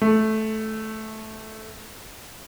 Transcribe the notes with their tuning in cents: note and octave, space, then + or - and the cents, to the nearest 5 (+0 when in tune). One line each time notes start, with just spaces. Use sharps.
A3 -10